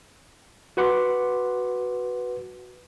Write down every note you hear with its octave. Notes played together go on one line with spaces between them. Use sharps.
F#4 B4 F#5 C6 D6